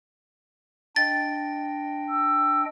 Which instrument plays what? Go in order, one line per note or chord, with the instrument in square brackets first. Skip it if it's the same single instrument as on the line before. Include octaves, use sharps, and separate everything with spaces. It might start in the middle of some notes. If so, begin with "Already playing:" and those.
[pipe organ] D4 D#5 G5 [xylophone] A6
[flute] E6